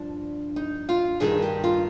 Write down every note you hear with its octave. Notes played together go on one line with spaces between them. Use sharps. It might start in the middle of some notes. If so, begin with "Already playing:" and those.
Already playing: G2 F3 D4
D#4
F4
G2 D#3 G3 G#4
G4
F4